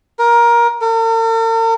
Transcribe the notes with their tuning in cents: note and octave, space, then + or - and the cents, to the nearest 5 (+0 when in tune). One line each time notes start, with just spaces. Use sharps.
A#4 +15
A#4 -45